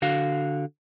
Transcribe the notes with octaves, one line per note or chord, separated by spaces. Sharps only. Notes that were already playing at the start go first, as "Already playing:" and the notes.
D3 F#4 F5